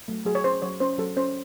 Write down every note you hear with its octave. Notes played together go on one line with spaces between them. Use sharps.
F#3 A3
F#3 G#4
C#5
C#4 C5
F#3 C#5
C#4 C5
F#3 A4
C#4 C5